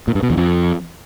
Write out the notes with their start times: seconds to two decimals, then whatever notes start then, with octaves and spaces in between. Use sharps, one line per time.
0.08 A#2
0.15 G2
0.23 B2
0.30 E2
0.37 F2